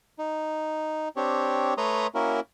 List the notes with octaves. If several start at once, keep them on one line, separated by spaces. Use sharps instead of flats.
D#4
C4 D4 G4 C#5
A3 B4 C#5 A#5 C6 D#6
A#3 C#4 E4 F#4 A#4